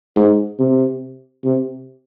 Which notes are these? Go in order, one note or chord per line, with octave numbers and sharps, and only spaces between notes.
G#2
C3
C3